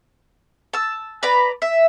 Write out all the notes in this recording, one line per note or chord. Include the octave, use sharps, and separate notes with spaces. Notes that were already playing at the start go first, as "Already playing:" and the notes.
A5 E6
B4 D5 A#5 B5
E5